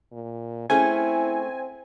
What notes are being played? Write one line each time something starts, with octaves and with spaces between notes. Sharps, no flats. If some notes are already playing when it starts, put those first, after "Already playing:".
A#2
A3 C4 C#4 E4 G#4 G#5